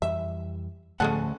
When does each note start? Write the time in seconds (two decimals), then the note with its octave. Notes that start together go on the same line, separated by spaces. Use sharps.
0.02 F2 E3 G3 E5
1.00 D2 A2 F3 A3 C#4 G#4 A4 F#5